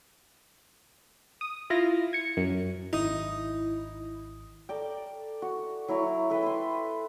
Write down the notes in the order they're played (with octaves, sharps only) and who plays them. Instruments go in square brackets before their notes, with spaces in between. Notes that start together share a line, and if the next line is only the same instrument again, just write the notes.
[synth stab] D#6
E4 F4 A#6
G#6 C#7
F#2
[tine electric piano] G#1 D#6 [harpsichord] D#4 [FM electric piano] E4
[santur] A4 A#4 D5 G5
F#4
F#3 E4 A#5 C#6
A4 B4 E5 G5
B4 C6